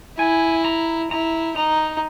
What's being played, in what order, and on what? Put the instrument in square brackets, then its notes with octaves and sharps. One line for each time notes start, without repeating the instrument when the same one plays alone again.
[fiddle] E4 [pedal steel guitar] G#5
[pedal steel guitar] A#5
[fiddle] E4 [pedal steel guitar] A#5
[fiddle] D#4 [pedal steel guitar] A#5